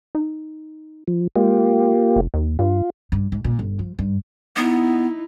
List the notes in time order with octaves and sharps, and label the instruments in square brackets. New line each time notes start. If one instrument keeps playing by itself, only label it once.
[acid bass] D#4
[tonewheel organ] F3
[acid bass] G#3 [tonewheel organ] A#3 F4 G4
[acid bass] F1
D#2
[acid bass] G2 [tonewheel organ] F4
[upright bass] G2
G#2
A#2
G1
F3
G2
[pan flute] B3 [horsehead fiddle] D#4 E4